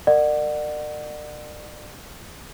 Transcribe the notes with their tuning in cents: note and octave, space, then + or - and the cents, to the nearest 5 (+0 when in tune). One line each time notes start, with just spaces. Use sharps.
A#4 -20 D5 +35 F#5 +0